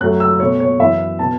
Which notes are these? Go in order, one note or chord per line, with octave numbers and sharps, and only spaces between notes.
F#2 F#3 A3 F#6
E6
B2 A3 C#5
C#5
F#2 E3 B3 E5
B2 B3 A5